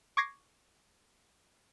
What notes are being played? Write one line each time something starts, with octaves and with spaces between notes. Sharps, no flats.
C#6 D6 G#6 A#6 C7